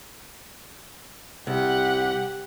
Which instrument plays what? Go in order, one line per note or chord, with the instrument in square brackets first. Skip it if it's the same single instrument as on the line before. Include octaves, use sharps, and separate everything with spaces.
[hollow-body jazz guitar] C2 [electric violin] G4 F#5